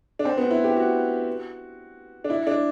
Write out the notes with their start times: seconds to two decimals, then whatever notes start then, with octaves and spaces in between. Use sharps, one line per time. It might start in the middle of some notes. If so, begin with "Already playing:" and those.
0.19 D4
0.25 C4
0.38 B3
0.51 E4
0.64 G4
0.76 F#4
2.24 D4
2.30 E4
2.47 D4